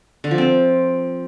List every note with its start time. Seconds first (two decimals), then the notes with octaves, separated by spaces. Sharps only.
0.24 D3
0.31 F3
0.38 C4